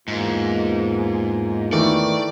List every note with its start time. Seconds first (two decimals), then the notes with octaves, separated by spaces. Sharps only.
0.08 E2 G#2 A#3 F4
1.73 D#3 E3 A3 D5